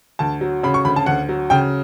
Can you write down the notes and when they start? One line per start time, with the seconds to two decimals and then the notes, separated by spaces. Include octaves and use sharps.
0.19 D2 A5
0.41 F#3
0.63 C#3 B5
0.74 C#6
0.85 D2 B5
0.96 A5
1.06 D2 F#5
1.29 F#3
1.50 C#3 G5